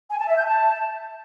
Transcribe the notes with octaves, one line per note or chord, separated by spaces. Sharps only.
G#5
A5
E5
G6
A5